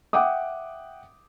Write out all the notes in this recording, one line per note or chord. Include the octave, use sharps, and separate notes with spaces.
E5 F#5 G5 D6 D#6